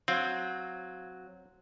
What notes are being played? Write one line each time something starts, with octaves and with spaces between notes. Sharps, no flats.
F#3 C4 F5 G#6